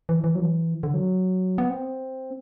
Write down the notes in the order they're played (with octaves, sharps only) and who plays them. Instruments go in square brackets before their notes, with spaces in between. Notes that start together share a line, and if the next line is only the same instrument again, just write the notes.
[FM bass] E3
E3
F#3
E3
D3
F#3
B3
C4